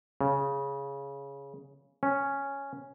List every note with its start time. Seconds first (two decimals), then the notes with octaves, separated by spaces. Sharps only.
0.21 C#3
2.03 C#4